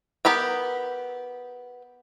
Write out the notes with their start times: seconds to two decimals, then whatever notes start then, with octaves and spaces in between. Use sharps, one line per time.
0.25 B3 G4 A#4 G5